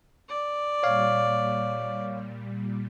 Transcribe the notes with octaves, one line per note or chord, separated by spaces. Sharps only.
D5
A#2 G3 C#5 F5